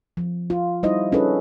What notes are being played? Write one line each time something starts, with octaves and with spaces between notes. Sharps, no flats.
F3
F4
G3 D#4 E4 C5 D#5
C#4 D4 E4 G#4 A4 B4